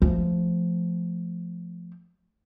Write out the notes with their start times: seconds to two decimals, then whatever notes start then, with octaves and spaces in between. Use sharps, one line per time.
0.02 F3 A3